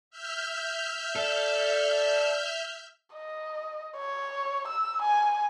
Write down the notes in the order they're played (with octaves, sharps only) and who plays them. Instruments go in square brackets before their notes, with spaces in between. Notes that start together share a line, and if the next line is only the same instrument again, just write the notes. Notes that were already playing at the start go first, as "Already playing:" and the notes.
[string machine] E5 F6 G6
[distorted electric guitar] A4 [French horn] D5
[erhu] D#5
C#5
E6
G#5